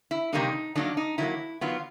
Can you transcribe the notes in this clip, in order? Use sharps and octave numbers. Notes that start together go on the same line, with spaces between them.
E4
C3 D#3 G3 A#3 D4 D#4
D#3 F#3 A#3 D4
D#4
D#3 F#3 A#3 E4
D#3 F#3 B3 D4 F4